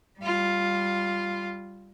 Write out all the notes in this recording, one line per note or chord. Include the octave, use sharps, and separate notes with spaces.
G3 F4